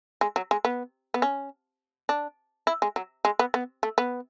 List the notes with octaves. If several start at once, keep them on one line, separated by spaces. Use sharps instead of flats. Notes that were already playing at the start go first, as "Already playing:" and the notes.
G#3
F#3
G#3
B3
B3
C#4
D4
E4
G#3
F#3
G#3
B3
B3
A3
B3